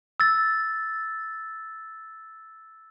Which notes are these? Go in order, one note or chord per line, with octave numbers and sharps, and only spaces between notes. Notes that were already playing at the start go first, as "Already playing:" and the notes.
E6 A6